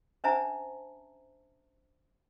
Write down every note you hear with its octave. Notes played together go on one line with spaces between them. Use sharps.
C#4 D4 C5 E5 A5 A#5